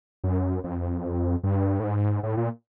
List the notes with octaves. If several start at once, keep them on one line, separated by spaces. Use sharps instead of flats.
F#2
F2
G2
A2
G#2
A2
A#2